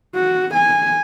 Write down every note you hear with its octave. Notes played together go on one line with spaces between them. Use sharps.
F#4
G#5